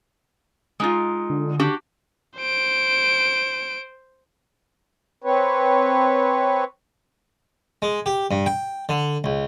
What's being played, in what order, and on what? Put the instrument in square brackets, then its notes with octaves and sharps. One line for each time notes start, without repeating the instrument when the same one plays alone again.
[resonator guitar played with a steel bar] G#3 D#4 F4
[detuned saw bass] D3
[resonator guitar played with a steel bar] D4 F#4 G4
[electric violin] C5 D7
[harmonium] C4 B4 C#5
[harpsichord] G#3
G4
G2
G5
D3
C#2